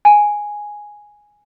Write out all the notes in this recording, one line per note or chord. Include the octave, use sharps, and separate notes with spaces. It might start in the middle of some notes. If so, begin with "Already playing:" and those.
G#5